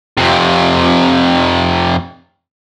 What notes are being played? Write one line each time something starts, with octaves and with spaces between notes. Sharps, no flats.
F2 C3